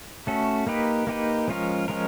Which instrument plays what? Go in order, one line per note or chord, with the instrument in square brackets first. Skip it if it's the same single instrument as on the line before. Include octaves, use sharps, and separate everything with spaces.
[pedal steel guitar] A3 C#4 F#4 A4
A#3 D#4 G4 B4
A#3 D#4 G4 B4
F3 G#3 C#4 F4 A#4
F3 G#3 C#4 F4 A#4